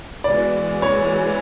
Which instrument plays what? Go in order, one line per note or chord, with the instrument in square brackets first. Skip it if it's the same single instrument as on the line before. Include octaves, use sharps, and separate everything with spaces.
[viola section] E3 G#3 B3 F#4 [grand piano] D5
[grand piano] C#5